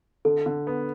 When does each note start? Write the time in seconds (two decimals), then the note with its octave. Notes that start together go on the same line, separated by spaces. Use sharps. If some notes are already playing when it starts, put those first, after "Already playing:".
0.25 D3 A4
0.46 D3
0.67 B3